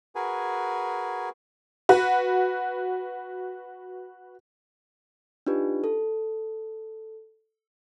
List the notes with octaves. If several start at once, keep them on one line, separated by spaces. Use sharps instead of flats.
F#4 G#4 A#4 B4 G#5
F#4 B4
D4 D#4 F4 G4 B4
A4